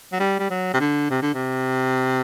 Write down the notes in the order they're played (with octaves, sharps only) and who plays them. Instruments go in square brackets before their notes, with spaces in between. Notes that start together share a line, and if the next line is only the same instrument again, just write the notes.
[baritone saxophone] F#3
G3
G3
F#3
C3
D3
C3
D3
C3